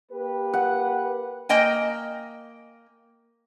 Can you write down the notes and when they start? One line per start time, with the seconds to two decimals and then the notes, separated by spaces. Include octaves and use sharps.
0.12 A#3 G4 B4
0.54 F#5
1.49 A#3 D#5 G5 G#5